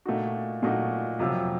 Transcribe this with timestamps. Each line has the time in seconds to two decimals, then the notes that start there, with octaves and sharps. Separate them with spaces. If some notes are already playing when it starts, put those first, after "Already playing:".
0.05 A#2 A3 D#4 F#4
0.63 A#2 A3 D#4 F#4
1.19 F2 C3 F#3